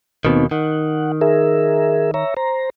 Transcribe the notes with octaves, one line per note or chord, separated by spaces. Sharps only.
D#2 B2 D#3 B3 C4 D#4
D#3 F#5
G#4 A#4 E5
C#5 E5 A#5
C5 A#5